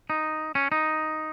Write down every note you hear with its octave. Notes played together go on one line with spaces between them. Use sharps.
D#4
C#4
D#4